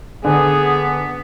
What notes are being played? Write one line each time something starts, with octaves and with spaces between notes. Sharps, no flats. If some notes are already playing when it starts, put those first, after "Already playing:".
D3 B3 G#4